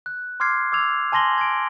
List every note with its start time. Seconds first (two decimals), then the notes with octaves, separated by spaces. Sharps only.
0.06 F#6
0.40 C6 D6 F6 G#6 C7
0.72 D6 E6 G#6 F7
1.12 G#5 A5 C6 A#6 F#7 G7
1.38 G#6 D7